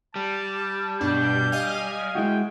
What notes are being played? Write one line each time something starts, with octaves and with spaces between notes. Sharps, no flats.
G3 A5
G2 B2 D4 G6
D#5 F5 G#5
G#3 E4 F#4 G5